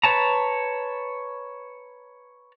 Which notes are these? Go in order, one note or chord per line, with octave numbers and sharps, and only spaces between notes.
B4 C#5 A5 A#5